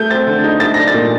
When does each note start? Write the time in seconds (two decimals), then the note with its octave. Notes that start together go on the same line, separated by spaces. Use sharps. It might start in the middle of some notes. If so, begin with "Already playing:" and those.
Already playing: A3 G6
0.11 C4 A6
0.27 D3
0.44 D#4
0.60 A3 A6
0.74 D4 A#6
0.88 A6
0.94 A#2